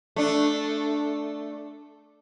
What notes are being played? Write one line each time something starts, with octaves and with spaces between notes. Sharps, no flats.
A3 D4